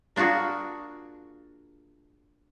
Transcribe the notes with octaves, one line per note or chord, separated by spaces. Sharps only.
A#3 D4 F4 F#4 G#4